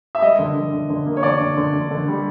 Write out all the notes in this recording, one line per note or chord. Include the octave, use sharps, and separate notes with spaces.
E5
G3 D#5
D3
D3
D3
D3
A#3
C#5
D3 D5
D3
D3
D3
D3
G3